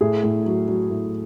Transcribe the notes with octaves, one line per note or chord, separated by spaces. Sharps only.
A2 G#4
A2
F#3
F#3
A2